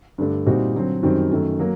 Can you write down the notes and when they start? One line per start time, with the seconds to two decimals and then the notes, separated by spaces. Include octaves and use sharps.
0.18 G2 D3 A3 D4
0.46 A#2 G3 C4 D#4 F#4
0.75 D3 F#3 C4
1.03 F#2 D#3 G3 C4
1.31 F#2 D#3 A3
1.59 F#3 A#3